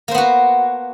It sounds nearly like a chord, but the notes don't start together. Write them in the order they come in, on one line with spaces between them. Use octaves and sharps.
A#3 C5 B3 F#4